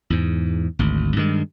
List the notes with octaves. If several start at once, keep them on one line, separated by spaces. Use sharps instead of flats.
E2 G#2
G#1 D2
G2 D#3 G#3